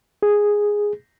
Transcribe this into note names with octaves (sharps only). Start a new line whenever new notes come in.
G#4